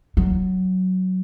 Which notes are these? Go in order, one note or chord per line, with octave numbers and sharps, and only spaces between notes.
F#3